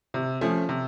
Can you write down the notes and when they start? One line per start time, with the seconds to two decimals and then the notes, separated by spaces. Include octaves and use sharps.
0.14 C3
0.41 F3 A3 C#4
0.69 C3